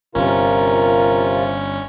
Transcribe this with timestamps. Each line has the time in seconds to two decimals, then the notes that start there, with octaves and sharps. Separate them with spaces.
0.15 G1 C3 C#4 F4 A#4